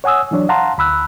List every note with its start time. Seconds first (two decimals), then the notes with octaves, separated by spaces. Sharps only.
0.04 C#5 F#5 G#5 D#6 E6
0.31 E3 F#3 D4 C#5
0.49 F5 F#5 A5 A#5 C6
0.78 D2 B5 E6 F#6